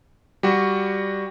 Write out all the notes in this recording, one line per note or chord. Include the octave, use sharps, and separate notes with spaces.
G3 F#4